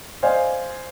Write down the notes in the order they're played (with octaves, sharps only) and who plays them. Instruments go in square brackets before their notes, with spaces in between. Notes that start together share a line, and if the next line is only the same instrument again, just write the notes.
[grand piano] C5 D5 D#5 F5 G#5